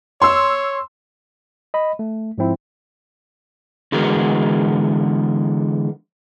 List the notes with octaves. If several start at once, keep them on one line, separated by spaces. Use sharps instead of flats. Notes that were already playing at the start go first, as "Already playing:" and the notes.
C#5 C6 E6
D#5 B5
A3
G#2 F3 C4 E4
D3 E3 G#3 B3 F#4 A#4